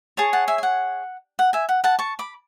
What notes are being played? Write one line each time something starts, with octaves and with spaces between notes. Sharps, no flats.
G#4 C#5 A5 C#6
F#5 A5
E5 G#5
G#5
F#5
F#5
E5 G#5
F#5
F#5 A5
A5 C#6
B5 D6